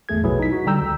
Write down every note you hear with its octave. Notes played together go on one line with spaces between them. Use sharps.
G1 E2 A3 G#4 G#6
A#1 B2 F#3 E4 G#4 B4
D#4 B6
F#4
D3 G3 G5 A#5 E6 G6
C#2